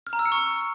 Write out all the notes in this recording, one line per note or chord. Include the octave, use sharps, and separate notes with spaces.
F6
A#5
E6
C#7
C#6